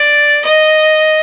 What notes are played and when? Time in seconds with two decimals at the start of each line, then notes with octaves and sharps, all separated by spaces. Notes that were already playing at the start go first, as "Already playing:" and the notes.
Already playing: D5
0.45 D#5